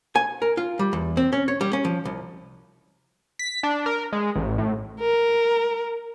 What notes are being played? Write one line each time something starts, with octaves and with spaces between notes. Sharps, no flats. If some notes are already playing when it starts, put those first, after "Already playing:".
G#5
A#4
F4
G3
E2
C4
C#4
C#5
G3
C#4
F3
C2
B6
D4
A#4
G#3
A1
A2
A#4